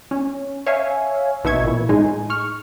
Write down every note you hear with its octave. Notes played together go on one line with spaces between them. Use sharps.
C#4
C#5 E5 F5 G#5
A1 B2 D#4 E5 C#6 G#6
A#2 E3
A2 G#3 D#4 G#5
C#6 F6